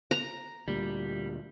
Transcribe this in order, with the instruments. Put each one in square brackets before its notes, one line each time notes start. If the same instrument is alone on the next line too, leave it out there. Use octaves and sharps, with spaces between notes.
[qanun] A#5
[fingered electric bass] D2 A#2 [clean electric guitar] G3